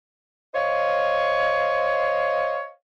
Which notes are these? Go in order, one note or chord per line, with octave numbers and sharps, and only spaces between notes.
C5 C#5 D#5 F5